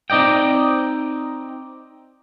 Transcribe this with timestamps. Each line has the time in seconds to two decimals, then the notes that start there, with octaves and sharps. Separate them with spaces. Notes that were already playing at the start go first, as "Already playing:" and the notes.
0.10 C4 D#4 D5 D#5 G5